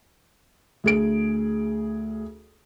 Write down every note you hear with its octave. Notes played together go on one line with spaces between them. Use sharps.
D2 G#4 D7